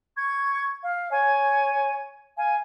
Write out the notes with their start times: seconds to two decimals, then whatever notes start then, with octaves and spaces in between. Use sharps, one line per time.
0.17 C#6 G#6
0.82 F5
1.10 C#5 G#5
2.36 F5 G#5